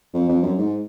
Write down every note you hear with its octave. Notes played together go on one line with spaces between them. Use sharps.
F2
F2
F#2
G#2